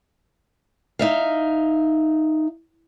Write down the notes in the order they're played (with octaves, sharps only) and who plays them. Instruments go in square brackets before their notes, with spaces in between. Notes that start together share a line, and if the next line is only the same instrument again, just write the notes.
[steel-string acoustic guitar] D#4 E5 F5